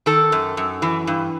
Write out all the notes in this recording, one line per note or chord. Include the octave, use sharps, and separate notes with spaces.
D#3 A4
F#2
F#2
E3
G2